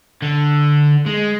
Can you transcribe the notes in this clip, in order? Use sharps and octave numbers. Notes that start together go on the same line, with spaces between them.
D3
G#3